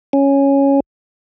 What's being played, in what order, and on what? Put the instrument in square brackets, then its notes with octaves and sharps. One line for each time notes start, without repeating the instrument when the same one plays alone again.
[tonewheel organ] C#4